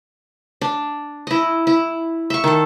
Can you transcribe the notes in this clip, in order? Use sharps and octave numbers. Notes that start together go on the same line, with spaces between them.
D4
E4 D#5
E4
E5 C#6
D#3 A4